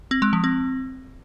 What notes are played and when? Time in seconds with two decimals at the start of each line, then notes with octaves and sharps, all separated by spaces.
0.11 C4
0.22 G#3
0.33 F3
0.44 C4